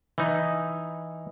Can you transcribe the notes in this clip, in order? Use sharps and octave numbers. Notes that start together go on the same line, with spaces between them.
E3 D#4